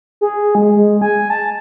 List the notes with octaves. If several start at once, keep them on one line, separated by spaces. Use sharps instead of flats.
G#4
G#3
G#3
G#5
A5